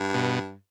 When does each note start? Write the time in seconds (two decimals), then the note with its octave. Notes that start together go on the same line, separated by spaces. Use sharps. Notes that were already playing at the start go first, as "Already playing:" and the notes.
Already playing: G2
0.14 B2